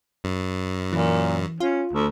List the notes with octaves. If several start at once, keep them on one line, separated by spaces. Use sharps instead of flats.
F#2
A#2 E3
C#4 F4
D2